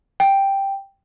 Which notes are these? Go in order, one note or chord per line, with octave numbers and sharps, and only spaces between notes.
G5